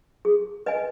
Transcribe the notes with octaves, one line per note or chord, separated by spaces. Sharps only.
G#4
B4 D#5 G#5